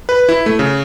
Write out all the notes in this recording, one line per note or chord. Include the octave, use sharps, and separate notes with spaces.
B4
E4
A3
C#3